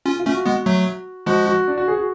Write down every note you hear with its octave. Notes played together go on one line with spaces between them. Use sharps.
C#4 F4
F4
A3 C#4
F#4
G#3 B3
F#3 A3
F3 G#3 F#4
F#4
D4
F#4
G#4
F#4